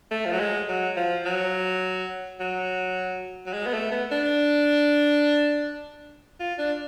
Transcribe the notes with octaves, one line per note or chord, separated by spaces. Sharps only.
A3
F3
F#3
G#3
F#3
F3
F#3
F#3
F#3
G#3
B3
A3
B3
D4
F4
D4